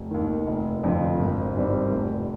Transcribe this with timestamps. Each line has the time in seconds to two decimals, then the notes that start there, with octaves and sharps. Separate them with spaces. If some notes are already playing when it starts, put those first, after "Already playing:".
Already playing: F1
0.11 D#2 D#3
0.47 F1
0.84 F2 D3 F3
1.19 G#1
1.57 G2 D#3 G3 C4
1.92 F1